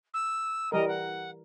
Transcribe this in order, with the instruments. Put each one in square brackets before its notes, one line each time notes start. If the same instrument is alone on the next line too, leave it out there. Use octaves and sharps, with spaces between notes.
[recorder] E6
[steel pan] E3 G3 A#4 [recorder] D#5
[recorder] F#5